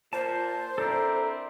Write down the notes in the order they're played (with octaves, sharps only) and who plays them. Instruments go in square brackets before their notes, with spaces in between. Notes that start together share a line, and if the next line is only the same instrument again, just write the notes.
[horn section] A#2 [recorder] C5 [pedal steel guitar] A5
[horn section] C4 D4 E4 [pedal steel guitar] A4 A#4